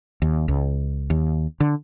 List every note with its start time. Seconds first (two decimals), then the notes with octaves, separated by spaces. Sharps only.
0.22 D#2
0.48 C#2
1.10 D#2
1.60 D3